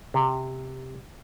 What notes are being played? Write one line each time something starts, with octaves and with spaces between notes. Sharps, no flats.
C3